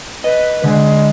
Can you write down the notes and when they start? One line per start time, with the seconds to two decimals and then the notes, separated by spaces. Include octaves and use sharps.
0.24 B4 D#5
0.64 D3 G#3